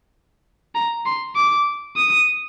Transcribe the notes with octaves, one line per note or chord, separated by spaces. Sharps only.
A#5
C6
D6
D#6